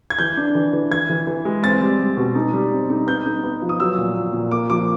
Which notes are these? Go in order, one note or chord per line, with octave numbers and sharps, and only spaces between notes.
G#6
E3 G6
D4
E3
E3
E3 G#6
E3
E3
G#3
C4 A6
G3
G3
B2
D#4
G3
C4
D#4
B3 G6
D#4
B3
F3
D#6
F#3 E6
A#2
A#2
A#2
A#3 D6
F3 D6